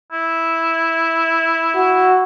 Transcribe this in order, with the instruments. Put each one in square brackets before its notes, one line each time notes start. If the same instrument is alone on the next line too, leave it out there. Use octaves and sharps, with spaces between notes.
[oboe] E4
[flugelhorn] F#4